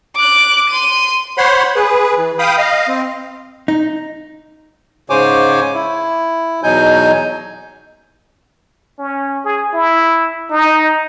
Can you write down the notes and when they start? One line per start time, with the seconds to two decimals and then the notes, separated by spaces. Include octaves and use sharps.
0.15 D6 F#6
0.69 C6 D#7
1.38 C5 C#5 F#5 B5 C6
1.75 G#4 B4
2.17 E3
2.39 F5 G5 B5 D#6
2.58 D#5 F5
2.88 C4
3.68 D#4
5.10 G#2 C#3 C5 C#5 G#5 D6
5.74 E4
6.63 E2 B2 F#3 D#4 G#5 G6
8.99 C#4
9.45 G#4
9.73 E4
10.51 D#4